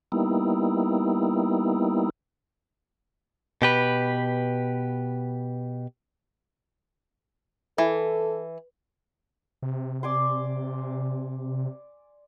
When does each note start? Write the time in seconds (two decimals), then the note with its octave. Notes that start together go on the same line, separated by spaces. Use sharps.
0.12 G3 A#3 B3 D#4 E4
3.62 B2 G4 B4
7.78 E3 A4
9.63 C3
10.03 D5 G#5 C6